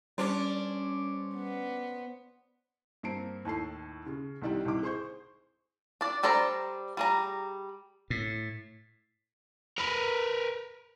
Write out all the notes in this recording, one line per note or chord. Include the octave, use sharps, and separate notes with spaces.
G3 C#4 D4 C5 D5
B3
G2 A#3 C4 A5 C7 D7
D#2 A2 A4 C7
C#3
C2 D#3 G3 D5 G5
C2 D#3 D6
G#4 C5 C6 C#6 G6
D4 D5
G3 D4 A4 C5 A#5
G3 G#4 A#5
A2
A#4 B4